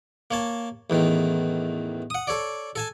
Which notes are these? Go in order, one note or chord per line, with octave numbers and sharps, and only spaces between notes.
A#3 C#5 A5
A1 E2 D#3
F#5 D#6
A4 C#5 D5
A4 G#5 A5